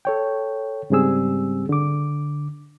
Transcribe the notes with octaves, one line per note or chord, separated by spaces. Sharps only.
A4 C#5 G5
G#2 C#3 G3 C4 G#4 E6
D3 D6